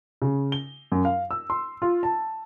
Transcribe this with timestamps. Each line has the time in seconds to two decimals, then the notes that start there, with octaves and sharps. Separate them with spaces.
0.22 C#3
0.52 G7
0.92 F#2
1.05 F5
1.31 E6
1.50 C6
1.82 F4
2.03 A5